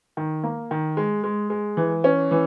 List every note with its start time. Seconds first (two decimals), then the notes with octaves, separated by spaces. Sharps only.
0.17 D#3
0.43 A#3
0.71 D#3
0.97 G#3
1.24 G#3
1.50 G#3
1.77 E3
2.04 C#4
2.31 E3